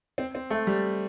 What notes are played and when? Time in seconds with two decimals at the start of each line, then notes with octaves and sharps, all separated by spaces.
0.18 C4
0.35 C4
0.50 A3
0.67 G3